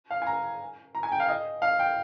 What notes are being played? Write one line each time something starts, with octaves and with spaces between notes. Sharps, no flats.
F5
G#5
A#5
A#5
G#5
G5
F5
D#5
F5
G5